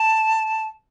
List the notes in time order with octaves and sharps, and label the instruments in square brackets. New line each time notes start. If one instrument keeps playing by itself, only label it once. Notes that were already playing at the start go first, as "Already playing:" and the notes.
Already playing: [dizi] A5